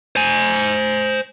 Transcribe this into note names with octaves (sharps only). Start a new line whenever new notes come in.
C5 G#5